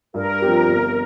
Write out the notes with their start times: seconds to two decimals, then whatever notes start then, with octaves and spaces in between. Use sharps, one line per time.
0.14 G2 A#4
0.42 F3 C4 G4
0.69 G1